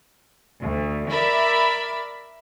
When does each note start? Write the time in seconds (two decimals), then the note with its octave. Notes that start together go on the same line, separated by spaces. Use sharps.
0.61 D2
1.10 A#4 D5 E5 B5